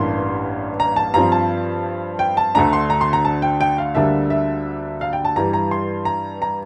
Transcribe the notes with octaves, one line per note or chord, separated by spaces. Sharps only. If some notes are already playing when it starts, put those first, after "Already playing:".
Already playing: A1 G2 E3 A#3 D4 C6
A#5
A5
G2 F3 C4 A#5
A5
G5
A5
D2 D3 A3 D4 A#5
C6
A#5
C6
A#5
A5
G5
G5
F5
D2 D3 G3 A#3 D4 E5
E5
F5
G5
A5
G2 E3 G3 A#5
A#5
C6
A#5
A#5